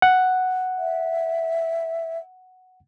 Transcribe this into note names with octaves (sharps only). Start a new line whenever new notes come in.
F#5
E5